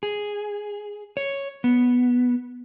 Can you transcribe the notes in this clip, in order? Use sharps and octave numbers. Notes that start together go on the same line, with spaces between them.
G#4
C#5
B3